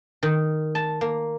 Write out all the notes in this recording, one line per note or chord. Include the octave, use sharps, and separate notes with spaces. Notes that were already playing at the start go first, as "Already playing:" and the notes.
D#3
A5
A#3